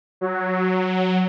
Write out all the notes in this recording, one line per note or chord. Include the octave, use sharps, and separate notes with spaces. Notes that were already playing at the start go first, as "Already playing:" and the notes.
F#3